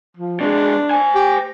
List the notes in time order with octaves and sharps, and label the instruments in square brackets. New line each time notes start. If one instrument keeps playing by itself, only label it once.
[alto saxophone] F3
[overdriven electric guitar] B2 G#3 [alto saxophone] D4
[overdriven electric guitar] C5 G#5
[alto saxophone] G4